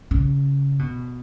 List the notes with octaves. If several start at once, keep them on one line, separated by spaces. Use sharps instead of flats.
C#3
B2